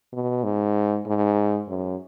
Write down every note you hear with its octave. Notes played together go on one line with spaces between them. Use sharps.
B2
G#2
G#2
F#2